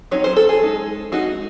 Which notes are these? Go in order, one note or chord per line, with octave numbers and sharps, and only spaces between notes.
F#3 C4 D#4 C#5
C5
A4
G#4
G#3 D#4
G#3 D#4 F#4